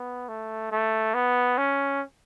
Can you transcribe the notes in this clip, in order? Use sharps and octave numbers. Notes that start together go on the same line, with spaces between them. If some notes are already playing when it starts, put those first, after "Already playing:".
Already playing: B3
A3
A3
B3
C#4